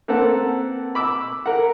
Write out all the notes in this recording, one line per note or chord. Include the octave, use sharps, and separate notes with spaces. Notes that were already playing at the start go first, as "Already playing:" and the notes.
A#3 C4 A4 B4 F#5
B5 D6 E6
A#4 F#5